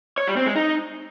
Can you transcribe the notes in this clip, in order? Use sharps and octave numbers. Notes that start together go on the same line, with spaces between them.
C#5
G3
C4
G#3
D#4